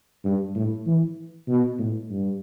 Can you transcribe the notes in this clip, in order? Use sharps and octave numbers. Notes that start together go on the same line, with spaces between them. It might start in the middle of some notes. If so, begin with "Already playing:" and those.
G2
A2
E3
B2
A2
G2